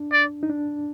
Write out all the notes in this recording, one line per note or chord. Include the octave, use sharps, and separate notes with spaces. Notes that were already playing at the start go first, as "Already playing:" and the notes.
Already playing: D4
D5
D#4
D4